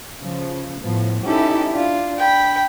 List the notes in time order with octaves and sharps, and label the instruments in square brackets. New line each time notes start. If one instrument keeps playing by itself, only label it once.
[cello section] C#3 F3
A2 F3 B3
[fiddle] C#4 A4 [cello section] D#4 E4 G4
[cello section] D4 [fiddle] F4
[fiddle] G5 B5